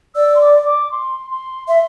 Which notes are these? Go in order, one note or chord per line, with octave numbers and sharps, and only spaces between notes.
D5 E6
C6
D6
D6
C6
C6
E5 C6